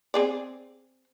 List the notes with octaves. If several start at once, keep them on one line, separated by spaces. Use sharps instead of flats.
C4 G#4 D5